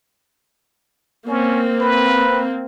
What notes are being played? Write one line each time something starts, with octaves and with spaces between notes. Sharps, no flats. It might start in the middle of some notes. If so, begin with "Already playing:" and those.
A#3 C4 C#4
B4